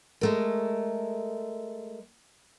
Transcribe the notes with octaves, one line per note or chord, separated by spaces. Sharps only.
G#3 A3 A#4